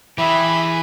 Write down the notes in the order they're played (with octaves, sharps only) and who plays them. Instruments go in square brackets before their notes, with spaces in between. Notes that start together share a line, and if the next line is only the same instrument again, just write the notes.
[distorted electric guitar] E3 [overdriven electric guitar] G4 G#4 [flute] E5 [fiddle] B5